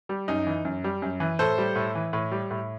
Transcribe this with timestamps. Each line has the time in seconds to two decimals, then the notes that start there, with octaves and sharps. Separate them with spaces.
0.09 G3
0.28 F#2 D#4
0.47 E3
0.65 F#2
0.84 G3
1.02 F#2
1.20 E3
1.39 A2 A4 C5
1.58 G3
1.76 A2
1.95 E3
2.13 A2
2.32 G3
2.51 A2